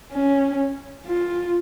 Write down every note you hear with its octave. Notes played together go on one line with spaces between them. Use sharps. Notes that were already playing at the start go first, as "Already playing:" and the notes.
C#4
F4